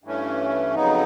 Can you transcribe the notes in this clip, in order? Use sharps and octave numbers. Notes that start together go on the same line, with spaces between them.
G2 E3 A3 C#4
F2 C#3 F#3 B3 D#4